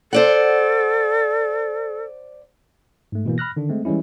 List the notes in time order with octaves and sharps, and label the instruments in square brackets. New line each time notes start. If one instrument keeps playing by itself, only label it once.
[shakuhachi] A4 [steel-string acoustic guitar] C5 D5 F#5
[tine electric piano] G#2 A3
B2 E3 A#3
B5 F6 F#6 A#6
D3 D#3 D4
G#3 A3 C4
E3 G3 G#3 C#4 E4